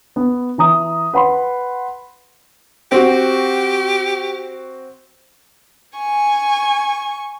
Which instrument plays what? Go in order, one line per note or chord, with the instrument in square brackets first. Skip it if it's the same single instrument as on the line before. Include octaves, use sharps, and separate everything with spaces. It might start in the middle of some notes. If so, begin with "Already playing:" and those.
[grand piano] B3
E3 A#5 D#6
B4 F#5 B5 C6
[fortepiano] C4 F#4 [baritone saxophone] G4
[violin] G#5 C#6